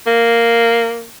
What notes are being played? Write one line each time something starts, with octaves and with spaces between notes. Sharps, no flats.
A#3